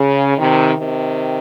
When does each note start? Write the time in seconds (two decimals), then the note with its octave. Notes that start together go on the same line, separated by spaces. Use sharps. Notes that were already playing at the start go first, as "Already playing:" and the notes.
Already playing: C#3
0.38 C3 D#3
0.77 C3 D#3